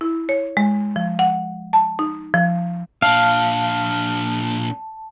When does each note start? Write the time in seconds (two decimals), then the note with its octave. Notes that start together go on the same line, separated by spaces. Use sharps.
0.01 E4
0.29 C#5
0.57 G#3
0.96 F3
1.19 F#5
1.73 A5
1.99 D#4
2.34 F3
3.02 A#2 D4 F5 A5